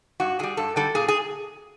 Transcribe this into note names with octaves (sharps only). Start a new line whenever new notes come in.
G2 F#4
D3 G3 G#4
G2 A4
D3 G3 A4
A#2 G#4
G#4